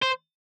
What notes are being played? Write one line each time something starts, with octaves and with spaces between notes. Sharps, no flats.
C5